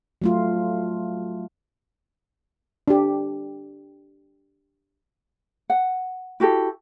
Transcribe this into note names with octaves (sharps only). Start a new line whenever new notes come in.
F#3 A3 F4
D4 G4
F#5
E4 F#4 G4 A4